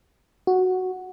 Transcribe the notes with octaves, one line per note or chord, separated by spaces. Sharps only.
F#4